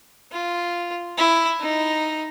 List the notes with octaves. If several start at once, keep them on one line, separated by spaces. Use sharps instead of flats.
F4
E4
D#4